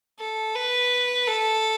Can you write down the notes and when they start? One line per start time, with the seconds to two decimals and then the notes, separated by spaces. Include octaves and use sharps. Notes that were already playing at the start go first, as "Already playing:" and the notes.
0.19 A4
0.56 B4
1.27 A4